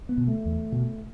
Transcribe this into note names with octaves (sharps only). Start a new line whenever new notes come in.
B3
B2
A3
E2
B2